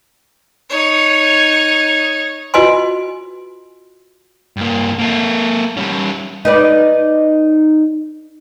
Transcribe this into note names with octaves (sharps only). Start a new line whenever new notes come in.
D#4 C#5
F4 F#4 B4 D#5 G#5 C6
G2 A#3
A#3 A4
G3 C#4
D#4 B4 D5